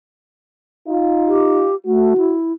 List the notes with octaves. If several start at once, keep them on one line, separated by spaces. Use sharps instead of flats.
D#4 F4
G4
A3 F#4
E4